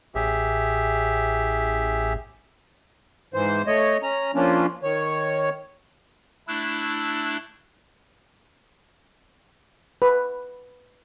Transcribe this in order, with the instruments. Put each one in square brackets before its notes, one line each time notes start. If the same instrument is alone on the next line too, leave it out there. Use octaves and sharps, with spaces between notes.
[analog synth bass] A1 [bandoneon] G4 G#4 E5
[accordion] G#2 E3 C5
A3 C#5 D#5
C#4 A#5
F3 A#3 C#4 D4 F4
D#3 C#5
[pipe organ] A3 D4 E4 E6 F#6
[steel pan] B4